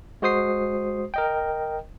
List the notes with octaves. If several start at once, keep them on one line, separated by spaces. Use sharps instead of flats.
G#3 F#4 C5 D#6 C7
A#4 D#5 G5